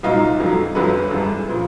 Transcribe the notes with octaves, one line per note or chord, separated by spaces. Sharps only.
C2 A#2 F#3 D#4 F4
F2 D3 F#3
G1 F2 D3 F#3 A4 B4
G#1 G2 E3 G#3
A#2 F3